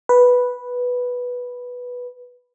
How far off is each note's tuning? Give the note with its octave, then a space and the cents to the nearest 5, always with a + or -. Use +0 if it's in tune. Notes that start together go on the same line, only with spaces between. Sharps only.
B4 -5